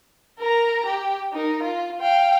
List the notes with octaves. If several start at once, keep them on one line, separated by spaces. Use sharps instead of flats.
A#4 A#5
G4
D#4 A#4
F4
F5 G5